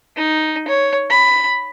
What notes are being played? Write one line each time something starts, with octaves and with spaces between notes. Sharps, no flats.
D#4
C#5
B5